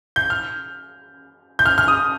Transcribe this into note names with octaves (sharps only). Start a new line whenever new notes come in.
G6
F6
G6
F6
F6
D#6